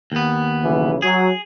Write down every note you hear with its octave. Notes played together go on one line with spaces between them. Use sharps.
D#2 B3
B1 C#3 E3
F#3 G#4